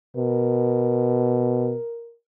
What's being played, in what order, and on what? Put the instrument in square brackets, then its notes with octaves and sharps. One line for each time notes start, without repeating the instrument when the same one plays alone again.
[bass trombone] B2 [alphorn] A#4